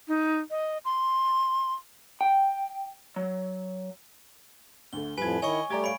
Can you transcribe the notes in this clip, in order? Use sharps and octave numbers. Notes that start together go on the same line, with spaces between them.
D#4
D#5
C6
G5
F#3
D2 D3 A3 G7
F2 A2 F3 G3 B4 G#5 G#6
D#3 E4 C#5 D#5 G#5 C#6
G3 A3 G4 D5 A#5 G#6
C#5 F5 B5 D7